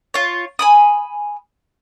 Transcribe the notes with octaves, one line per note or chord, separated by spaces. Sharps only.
F4 C#5
G#5 B5 D#6